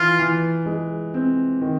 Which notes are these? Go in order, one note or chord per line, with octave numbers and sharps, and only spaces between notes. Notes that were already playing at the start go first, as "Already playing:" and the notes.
Already playing: E3 F4
E3
G#3
C4
D#3